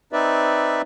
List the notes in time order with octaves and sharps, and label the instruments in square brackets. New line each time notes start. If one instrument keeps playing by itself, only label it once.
[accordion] C4 D#4 B4 D5 E5